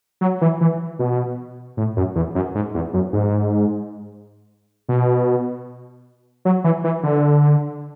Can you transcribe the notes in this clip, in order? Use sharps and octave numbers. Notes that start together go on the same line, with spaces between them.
F#3
E3
E3
B2
A2
F#2
E2
F#2
G#2
E2
F#2
G#2
B2
F#3
E3
E3
D3